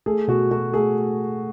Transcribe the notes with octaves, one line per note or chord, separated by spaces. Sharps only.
A3 G#4
B2 F#4
A3 F#4
A3 G#4